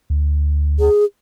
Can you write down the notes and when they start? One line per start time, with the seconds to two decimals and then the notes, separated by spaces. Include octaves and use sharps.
0.10 D2
0.79 G#4